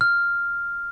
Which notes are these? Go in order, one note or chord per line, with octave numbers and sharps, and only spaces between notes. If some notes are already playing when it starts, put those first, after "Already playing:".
F6